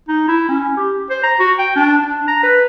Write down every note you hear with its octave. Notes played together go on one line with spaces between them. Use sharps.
D#4
E4
C#4
G4
C5
A#5
F#4
G5
D4
D4
A#5
B4